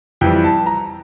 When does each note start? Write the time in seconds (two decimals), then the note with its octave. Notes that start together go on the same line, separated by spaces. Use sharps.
0.21 F2 E3 G3 G5
0.44 A5
0.66 A#5